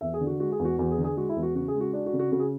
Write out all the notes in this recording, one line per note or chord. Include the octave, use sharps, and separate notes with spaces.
E2 E5
G#4
D3
F#4
G#3 F#4
G#4
E2
F#4
E2 F#4
G#4
D3
G#4
G#3 F#4
E4
E2
F#4
C#3 F#4
G#4
G#3
F#4
D4 F#4
F#4
C#3
F#4
C#3 F#4
G#4